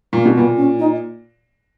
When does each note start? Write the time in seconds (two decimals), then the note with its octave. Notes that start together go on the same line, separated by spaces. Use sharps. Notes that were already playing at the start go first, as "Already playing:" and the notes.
0.13 A#2 A#3
0.25 B2
0.35 A#2 B3
0.57 C#4
0.79 D#4